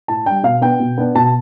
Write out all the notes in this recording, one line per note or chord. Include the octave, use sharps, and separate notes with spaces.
A2 A5
G3 D4 G5
B2 F5
B3 D4 G5
B2
B3 D4
B2 A5